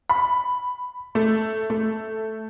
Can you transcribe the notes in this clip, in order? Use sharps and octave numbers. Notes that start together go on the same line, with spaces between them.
B5
A3
A3